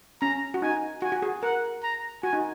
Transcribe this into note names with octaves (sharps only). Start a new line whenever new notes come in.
C#4 A#5
F#4
D#4 G#5
F#4 G#5
F#4
G#4
A#4 F#5
A#5
F#4 G#5
D#4